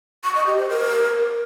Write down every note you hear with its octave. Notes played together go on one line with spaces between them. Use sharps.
C#6
D#5
G4
C5
A#4